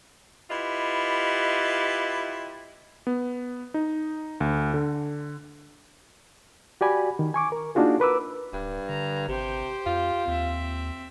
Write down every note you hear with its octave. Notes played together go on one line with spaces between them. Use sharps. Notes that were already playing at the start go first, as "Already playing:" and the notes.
E4 F4 G4 B4 D#5 E5
B3
D#4
D2
D3
F#4 G4 D5 G#5 B5
D#3
G#5 C#6 D6
A#4
A#3 D4 D#4 F4 F#4 G#4
A#4 B4 D6 E6
D1 G2
D3 A#5
G#1 C3 G4 C5
F2 F4
D#2 C4 E5